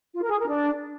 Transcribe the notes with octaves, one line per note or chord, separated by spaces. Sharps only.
F4
A#4
G#4
A#4
D4